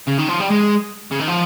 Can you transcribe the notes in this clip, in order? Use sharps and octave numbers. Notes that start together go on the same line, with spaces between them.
C#3
D#3
F3
G3
G#3
C#3
D#3
F3